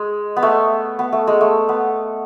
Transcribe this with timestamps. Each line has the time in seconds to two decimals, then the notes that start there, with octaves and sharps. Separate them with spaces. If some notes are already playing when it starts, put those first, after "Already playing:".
Already playing: G#3
0.37 B3
0.43 A3
0.99 B3
1.12 A3
1.27 G#3
1.41 A3
1.69 B3